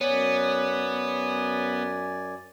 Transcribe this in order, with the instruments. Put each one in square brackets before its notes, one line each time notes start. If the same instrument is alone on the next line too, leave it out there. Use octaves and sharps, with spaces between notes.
[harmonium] F#2 D5 G#5 [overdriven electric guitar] B3 [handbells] C#5